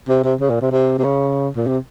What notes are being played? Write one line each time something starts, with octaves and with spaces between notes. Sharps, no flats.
C3
C3
C#3
A#2
C3
C3
C3
C#3
A#2
C3